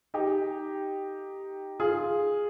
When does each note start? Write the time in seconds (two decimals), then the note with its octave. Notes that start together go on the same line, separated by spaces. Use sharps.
0.14 D#4 G4
1.80 F4 G#4